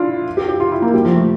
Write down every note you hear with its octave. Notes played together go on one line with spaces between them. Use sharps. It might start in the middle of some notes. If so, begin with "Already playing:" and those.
Already playing: D4 E4 F4
G4
G4
F4
E4
A#3
G3
F3
A3